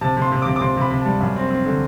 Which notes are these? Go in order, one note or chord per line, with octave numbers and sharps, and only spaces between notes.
C3 A5
C3
C6
C3
C3 D6
D6
C3 C6
C3 B5
C3
G3 A5
F#2
C4
C4
D3